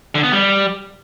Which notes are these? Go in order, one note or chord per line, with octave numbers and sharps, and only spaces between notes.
D3
B3
G3